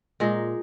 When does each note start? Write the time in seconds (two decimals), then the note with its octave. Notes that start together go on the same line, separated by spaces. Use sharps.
0.20 A#2 G#3 D#4